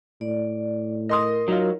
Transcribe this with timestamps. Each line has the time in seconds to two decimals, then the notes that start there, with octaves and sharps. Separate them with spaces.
0.21 A2 D5
1.09 A#4 D#5 C6 D#6
1.48 F#3 D#4 F4